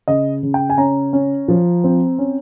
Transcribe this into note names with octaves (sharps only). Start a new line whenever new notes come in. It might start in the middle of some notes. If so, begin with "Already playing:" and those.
C#3 D#5
C#3
G5
G#5
C#4 A#5
C#4
F3
C4
C#4